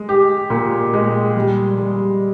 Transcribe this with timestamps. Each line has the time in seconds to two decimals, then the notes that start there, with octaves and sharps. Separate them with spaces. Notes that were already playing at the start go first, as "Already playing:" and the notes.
Already playing: G#3
0.09 G4
0.50 A#2
0.94 G#3
1.36 G3
1.78 G3